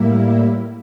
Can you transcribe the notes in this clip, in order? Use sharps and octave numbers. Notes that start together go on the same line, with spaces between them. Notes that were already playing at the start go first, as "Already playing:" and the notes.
Already playing: A2 G3 A#3 E4